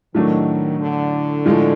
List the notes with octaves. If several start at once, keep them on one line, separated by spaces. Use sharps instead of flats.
A2 D#3 F#3 A3 D4
D3
A2 F3 G#3